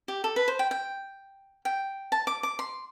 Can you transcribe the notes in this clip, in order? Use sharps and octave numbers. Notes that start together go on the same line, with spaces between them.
G4
A4
B4
C5
G5
G5
G5
A5
D6
D6
C6